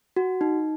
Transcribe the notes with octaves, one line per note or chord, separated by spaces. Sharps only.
F#4
D#4